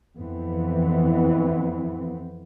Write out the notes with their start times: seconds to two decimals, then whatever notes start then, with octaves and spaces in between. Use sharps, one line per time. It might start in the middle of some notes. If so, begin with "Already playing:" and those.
0.16 F2 E3 B3 C4